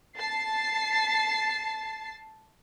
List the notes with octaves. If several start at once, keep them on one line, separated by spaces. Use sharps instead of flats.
A5 A6 C7